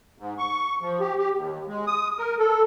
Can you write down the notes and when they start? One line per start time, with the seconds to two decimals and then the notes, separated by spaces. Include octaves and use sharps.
0.18 G#2
0.38 C#6
0.81 F3
1.00 G4
1.18 G4
1.35 D#2
1.67 G#3
1.87 D#6
2.18 A#4
2.39 A4